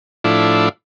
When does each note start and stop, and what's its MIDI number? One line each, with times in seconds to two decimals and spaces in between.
0.24 0.69 45
0.24 0.69 53
0.24 0.69 62
0.24 0.69 64